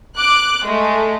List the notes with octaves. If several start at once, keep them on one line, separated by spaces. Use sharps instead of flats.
D6 F#6
G#3 A3